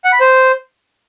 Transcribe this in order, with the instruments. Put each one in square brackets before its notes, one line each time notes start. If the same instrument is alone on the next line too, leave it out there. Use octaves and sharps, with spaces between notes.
[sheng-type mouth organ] F#5
B5
C5